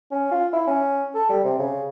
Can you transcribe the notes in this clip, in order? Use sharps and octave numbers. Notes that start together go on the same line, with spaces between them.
C#4
F4
E4
C#4
A4
G3
C3
C#3